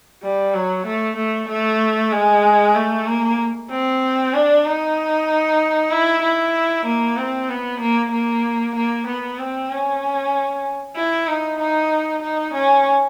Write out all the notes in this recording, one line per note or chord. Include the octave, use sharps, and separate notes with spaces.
G3
F#3
A3
A3
A3
G#3
A3
A#3
C4
D4
D#4
E4
E4
A#3
C4
B3
A#3
A#3
A#3
B3
C4
C#4
E4
D#4
D#4
D#4
C#4